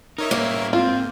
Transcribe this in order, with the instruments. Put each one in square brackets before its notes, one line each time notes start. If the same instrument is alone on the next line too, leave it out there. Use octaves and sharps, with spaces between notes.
[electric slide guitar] D#4 [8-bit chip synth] A#4 C#5 E5
[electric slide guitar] G3 E4 G#4 [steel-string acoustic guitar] A#3
[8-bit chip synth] G#2 [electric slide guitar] C4 [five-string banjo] F4